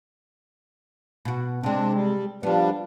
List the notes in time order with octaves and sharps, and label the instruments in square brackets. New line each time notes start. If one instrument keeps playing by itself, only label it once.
[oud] B2 F#4
[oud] C3 G#3 [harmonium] C4 D4
[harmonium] G3
[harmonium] F3 G3 D4 [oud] B3 F4